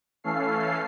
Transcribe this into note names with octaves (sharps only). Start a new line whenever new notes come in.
E3 A3 C#4 A4 F5 C7